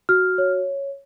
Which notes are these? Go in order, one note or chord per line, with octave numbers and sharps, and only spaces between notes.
F#4 F6
C#5